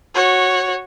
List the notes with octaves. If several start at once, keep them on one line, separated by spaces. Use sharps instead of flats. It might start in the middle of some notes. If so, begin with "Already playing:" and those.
F#4 C#5